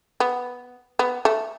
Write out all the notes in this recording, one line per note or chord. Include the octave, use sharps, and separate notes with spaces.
B3
B3
A3